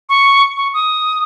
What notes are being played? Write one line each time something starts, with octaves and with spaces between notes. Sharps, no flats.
C#6
C#6
D#6